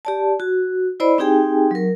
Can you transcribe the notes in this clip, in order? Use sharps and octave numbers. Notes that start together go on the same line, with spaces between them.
G4 D5 A5
F#4
E4 C5 D5 D#5 B5
C4 D#4 G4 G#4 G5 G#5
F#3 A#4